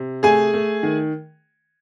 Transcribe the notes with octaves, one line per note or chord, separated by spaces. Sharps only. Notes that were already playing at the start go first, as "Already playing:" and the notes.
Already playing: C3
A3 G#4 G#5
A3
D#3